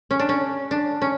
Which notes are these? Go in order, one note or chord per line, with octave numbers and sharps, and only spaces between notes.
C#4
D4
C#4
D4
C#4